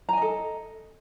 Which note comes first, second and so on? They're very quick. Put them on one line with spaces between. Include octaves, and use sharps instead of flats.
A#5 G#5 D#5 A4